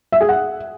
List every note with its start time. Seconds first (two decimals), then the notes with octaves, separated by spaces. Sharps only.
0.12 E5
0.21 G#4
0.29 F#5